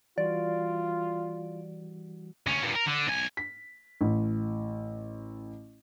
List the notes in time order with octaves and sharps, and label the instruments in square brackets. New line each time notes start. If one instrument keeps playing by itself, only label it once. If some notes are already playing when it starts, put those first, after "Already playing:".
[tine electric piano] E3 G3 F#4 [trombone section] F4 [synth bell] D5
[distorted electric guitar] D2 C#4
G2 A#2
A#4
D3
B1 G#5
[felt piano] B6
A1